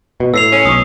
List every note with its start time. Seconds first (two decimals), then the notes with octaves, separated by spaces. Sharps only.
0.20 B2
0.34 A2 E6 C7 F7
0.52 C#4
0.66 B1 C#6 D#6